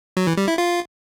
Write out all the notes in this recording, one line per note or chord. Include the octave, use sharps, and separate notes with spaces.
F#3
E3
G3
E4
F4